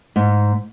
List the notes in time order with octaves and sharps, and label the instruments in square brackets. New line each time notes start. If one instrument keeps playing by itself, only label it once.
[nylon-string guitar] G#2